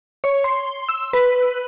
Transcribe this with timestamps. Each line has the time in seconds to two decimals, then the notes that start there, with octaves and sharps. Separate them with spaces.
0.24 C#5
0.44 C6
0.89 E6
1.13 B4